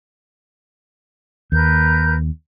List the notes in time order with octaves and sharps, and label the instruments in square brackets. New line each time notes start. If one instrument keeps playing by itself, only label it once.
[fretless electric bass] D#2 [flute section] A#4 B4 G6